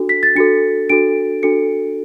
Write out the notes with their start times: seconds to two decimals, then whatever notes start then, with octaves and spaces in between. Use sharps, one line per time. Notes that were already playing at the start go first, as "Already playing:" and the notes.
Already playing: D4 F#4 A4
0.09 B6
0.23 A6
0.36 D4 F#4 A4 C#7
0.89 D4 F#4 A4 D7
1.43 D4 F#4 A4 C#7